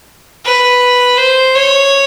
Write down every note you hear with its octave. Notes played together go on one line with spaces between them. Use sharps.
B4
C5
C#5